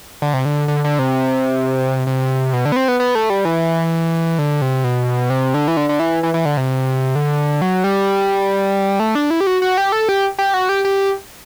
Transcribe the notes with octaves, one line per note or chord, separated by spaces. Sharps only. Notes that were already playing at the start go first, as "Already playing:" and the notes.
D3
C3
D3
D3
D3
C3
C3
B2
D3
B3
C4
B3
B3
A3
G3
E3
D3
C3
B2
C3
D3
E3
D3
D3
E3
E3
E3
D3
C3
D3
F#3
G3
A3
D4
E4
G4
F#4
F#4
G4
A4
G4
G4
F#4
G4
G4